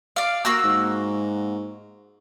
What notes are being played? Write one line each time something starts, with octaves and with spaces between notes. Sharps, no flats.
D5 F5
A#3 F#4 E6
G#2